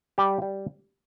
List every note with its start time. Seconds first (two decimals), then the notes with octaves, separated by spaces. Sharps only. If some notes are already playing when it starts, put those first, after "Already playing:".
0.18 G3 G4
0.42 G3